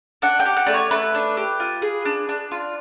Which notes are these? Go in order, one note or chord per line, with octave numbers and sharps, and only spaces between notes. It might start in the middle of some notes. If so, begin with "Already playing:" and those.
D4 F#5
G5
G4
F#5
A3 D5
C#5
A3 B4
D4
G4
F4
G#4
D4
D4
F4